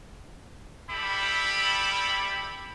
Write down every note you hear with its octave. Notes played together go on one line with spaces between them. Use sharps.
G3 E4 G4 A4 B5